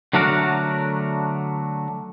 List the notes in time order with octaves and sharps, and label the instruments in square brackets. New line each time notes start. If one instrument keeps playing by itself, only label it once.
[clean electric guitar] D3 F#3 A3 D4 F#4 A#4